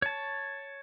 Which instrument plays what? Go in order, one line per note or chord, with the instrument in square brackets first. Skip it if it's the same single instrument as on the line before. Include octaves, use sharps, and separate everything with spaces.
[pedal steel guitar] C#5 A5